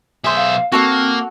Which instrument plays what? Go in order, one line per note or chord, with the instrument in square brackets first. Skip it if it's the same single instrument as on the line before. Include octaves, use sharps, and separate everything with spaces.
[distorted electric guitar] B1 E5 [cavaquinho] G#4 C5
[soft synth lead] F5
[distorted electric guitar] A#3 [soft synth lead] C4 [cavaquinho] F#4 A4 F#5